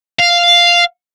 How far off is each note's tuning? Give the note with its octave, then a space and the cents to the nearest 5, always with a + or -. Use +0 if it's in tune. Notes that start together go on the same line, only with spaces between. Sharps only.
F5 -5